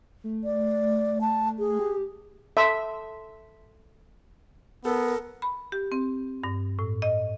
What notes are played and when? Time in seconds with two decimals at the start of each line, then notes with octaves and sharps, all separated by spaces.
0.24 A3
0.44 D5
1.21 A5
1.59 G#4
1.79 G4
2.57 A4 E5 A5 C6
4.85 B3 A4 A#4
5.42 B5
5.72 G4
5.92 C4
6.44 G2
6.79 A2
7.02 D#5